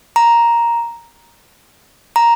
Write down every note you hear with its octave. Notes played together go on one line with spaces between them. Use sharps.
A#5
A#5